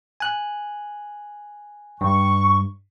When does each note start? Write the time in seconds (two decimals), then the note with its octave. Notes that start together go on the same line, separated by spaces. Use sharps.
0.20 G#5 F#6
2.01 G2 C#6